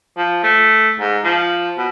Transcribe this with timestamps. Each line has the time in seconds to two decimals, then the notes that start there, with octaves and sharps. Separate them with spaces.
0.17 F3
0.44 A3
1.00 G#2
1.24 F3
1.77 B2